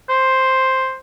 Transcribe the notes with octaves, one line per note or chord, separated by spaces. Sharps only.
C5